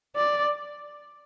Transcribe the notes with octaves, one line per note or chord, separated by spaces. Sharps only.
D5